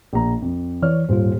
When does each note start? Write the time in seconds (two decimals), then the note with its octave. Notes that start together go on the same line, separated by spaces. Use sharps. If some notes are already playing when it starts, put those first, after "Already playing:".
0.13 A#1 A#5
0.42 F2
0.82 E3 C#5 D5 F6
1.09 D#1 G#2 G3 F4 C5